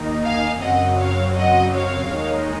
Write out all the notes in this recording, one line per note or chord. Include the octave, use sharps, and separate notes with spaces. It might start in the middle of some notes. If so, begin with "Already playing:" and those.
Already playing: D#2 D#3 A#3 D#4
F5 G#5
F#2 C#3 F#3 C4 D#5 F#5
C#5 F5
D#5 F#5
C#5 F5
D#2 D#3 G#3 D#4